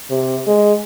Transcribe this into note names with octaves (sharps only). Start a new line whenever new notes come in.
C3
G#3